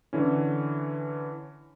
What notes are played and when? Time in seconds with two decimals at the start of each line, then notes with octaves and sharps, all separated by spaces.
0.13 D3 E3 C#4